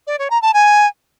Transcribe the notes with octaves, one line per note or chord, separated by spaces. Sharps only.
D5
C#5
A#5
A5
G#5